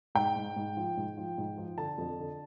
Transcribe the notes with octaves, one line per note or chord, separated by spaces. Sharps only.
G#2 G5
G#2
G#2
F3
G#2
F3
G#2
F3
D3 A5
F2
D3